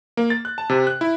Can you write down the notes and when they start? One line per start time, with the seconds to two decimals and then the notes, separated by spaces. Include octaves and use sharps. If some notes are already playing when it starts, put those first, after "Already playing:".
0.17 A#3
0.30 A6
0.45 F#6
0.58 A5
0.69 C3
0.87 F#6
1.01 E4